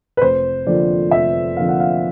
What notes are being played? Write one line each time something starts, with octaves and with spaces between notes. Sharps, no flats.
B4
F1 C5
F2 D3 F3 A#3 D5
F1 E5
F2 D3 F3 A#3 F5
F#5
F5